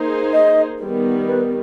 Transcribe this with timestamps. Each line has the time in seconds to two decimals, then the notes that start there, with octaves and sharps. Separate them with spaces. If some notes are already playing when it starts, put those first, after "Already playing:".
Already playing: A#3 D#4 G#4 C5
0.33 D#5
0.80 D#3 G3 B3
1.27 B4